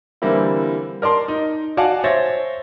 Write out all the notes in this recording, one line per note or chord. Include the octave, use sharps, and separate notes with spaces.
D3 E3 G3 A#3 C4 E4
A#4 D5 A5 C6
D#4
F#4 D5 F5 F#5 G#5 A5
C5 C#5 E5 A6 A#6